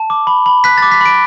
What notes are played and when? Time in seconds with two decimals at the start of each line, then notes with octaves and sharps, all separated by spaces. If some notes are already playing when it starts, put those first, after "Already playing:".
Already playing: A5
0.10 D6
0.27 B5
0.46 B5
0.64 F#6 B6
0.78 A6
0.82 D6
0.92 B6
1.01 B5 D7